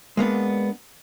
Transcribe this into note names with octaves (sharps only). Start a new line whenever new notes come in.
G#3 A#3 B3 D4